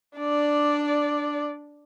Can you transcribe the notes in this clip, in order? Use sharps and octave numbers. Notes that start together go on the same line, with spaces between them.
D4 D5